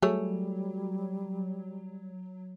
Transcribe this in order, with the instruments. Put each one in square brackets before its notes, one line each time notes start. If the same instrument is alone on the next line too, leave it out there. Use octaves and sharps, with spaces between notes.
[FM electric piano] F#3 [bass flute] G3 [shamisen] A3 G#4 C#5